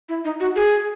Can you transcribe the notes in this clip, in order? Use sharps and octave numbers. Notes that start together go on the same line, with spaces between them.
E4
D#4
F#4
G#4